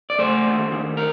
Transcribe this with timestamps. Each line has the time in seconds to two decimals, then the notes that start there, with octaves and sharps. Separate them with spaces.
0.10 D5
0.19 A3 C5
0.46 D#2
0.72 D#2
0.97 A#4